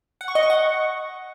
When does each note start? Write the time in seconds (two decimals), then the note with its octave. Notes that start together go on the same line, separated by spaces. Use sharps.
0.21 F#5
0.28 C#6
0.35 D#5
0.43 C#6
0.50 F#5